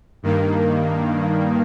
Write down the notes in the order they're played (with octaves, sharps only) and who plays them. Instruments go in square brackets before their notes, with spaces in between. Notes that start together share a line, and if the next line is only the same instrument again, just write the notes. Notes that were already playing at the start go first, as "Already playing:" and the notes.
[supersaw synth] G2 D#3 A#3